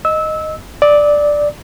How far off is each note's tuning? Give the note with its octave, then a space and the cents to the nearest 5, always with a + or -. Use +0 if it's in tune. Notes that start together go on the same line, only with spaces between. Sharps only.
D#5 +0 E6 -20
D5 +0 E6 -45